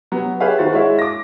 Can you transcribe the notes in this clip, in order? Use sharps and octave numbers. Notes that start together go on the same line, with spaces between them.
C3 F#3 B3
G4 G#4 B4 C#5 E5 F5
D#3 F#4 C5 A6
G#3 E4 F#4 C#5 E5 F5
D6 A#6